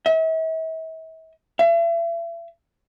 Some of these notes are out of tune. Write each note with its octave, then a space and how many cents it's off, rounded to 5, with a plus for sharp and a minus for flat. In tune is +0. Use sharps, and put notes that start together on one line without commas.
E5 -40
E5 +40